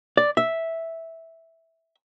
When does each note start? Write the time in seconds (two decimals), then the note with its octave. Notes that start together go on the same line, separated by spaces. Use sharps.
0.17 D5
0.37 E5